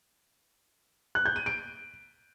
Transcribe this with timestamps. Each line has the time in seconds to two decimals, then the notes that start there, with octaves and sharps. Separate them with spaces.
1.15 F#6
1.25 G6
1.36 D#7
1.46 D7